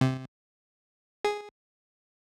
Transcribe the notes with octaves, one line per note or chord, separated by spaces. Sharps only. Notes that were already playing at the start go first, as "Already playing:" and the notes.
C3
G#4